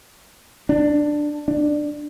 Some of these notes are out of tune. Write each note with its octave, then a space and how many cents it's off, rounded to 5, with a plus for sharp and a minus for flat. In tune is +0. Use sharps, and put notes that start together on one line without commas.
D4 +10
D4 +15